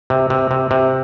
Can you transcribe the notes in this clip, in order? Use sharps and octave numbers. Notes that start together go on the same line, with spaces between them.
C3
C3
C3
C3